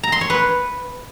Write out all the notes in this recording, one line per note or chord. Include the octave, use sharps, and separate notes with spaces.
A#5
C6
C#5
B4